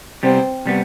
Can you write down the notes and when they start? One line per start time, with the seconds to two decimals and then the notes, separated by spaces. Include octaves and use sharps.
0.23 C3 G3 B3 C4
0.66 C3 G3 B3